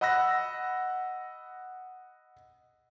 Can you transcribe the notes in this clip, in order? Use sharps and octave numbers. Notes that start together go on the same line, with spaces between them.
D#5 F#5 B5 E6 F#6 A#6